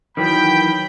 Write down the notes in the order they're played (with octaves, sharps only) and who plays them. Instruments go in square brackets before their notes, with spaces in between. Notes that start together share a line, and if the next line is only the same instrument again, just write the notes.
[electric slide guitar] D#3 E3 F#3 [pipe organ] G5 [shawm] B5